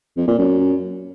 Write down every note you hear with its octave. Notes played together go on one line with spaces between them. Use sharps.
F2
A#2
F#2